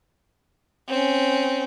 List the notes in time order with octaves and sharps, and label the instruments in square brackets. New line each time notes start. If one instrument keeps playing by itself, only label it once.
[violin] C4 C#4